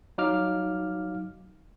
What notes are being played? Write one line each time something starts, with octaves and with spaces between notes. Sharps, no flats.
F#3 D#4 F5 D6 F6